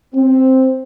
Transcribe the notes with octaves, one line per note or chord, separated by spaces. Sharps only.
C4